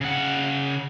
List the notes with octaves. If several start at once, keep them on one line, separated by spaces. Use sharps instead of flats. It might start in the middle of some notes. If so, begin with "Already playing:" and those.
C#3 F#5